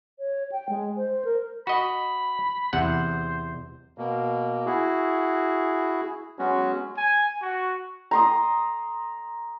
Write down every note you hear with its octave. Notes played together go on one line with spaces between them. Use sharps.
C#5
G5
G#3
C5
A#4
F#4 D#5 B5
E2 C3 C5 F#5
B2 A#3
E4 F#4 G#4
F#3 G#3 B3 C#4 F#4
G#5
F#4
A#5 C6 D#6